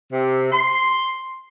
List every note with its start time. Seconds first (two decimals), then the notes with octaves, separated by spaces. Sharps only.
0.12 C3
0.52 C6